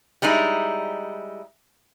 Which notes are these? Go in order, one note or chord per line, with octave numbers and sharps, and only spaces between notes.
G3 G#3 D#4 E4